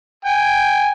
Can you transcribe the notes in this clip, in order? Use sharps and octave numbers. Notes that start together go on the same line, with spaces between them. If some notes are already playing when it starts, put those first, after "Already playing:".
G5 G#5